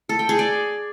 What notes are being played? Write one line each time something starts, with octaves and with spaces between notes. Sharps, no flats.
A4
G5
G#4
D5